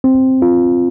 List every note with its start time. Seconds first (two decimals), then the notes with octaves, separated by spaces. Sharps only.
0.04 C4
0.42 F4